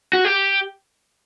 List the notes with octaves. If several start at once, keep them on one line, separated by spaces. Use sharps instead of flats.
F#4
G4